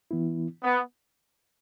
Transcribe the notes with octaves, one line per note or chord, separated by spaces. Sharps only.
E3 B3 E4
B3